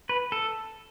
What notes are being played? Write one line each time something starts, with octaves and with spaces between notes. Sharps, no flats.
B4
A4